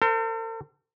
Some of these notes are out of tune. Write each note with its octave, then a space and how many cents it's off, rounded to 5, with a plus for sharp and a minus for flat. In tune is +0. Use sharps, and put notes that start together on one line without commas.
A4 +45 C5 -25